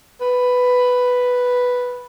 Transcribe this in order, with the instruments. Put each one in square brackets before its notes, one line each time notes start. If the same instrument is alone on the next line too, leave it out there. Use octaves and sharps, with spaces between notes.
[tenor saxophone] B4